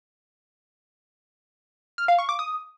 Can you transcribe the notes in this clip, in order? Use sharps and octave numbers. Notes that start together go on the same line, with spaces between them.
F6
F5
C#6
D6
D#6